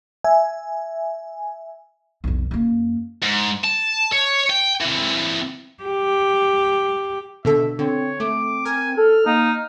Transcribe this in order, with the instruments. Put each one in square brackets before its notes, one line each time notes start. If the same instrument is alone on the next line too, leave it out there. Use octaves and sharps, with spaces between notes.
[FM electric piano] E5 G#5
[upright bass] B1 F2
F#2 A#3
[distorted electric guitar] G#2
A5
C#5
G5
E3 C4
[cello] G4
[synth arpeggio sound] B2 D3 A4 [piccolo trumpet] E5
[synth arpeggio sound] D3 [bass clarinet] C4 [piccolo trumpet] C#5
[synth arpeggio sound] A3 [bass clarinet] C4 [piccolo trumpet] D6
[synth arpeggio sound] A#4 [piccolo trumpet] G#5
[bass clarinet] A4 [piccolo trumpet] F6
[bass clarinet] A#3 [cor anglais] D#4